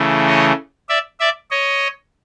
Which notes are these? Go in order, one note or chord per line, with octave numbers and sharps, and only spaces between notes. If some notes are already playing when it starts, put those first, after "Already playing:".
Already playing: C#3 E3 A3
C#5 D#5
D5 E5
D5 E5
C#5 D#5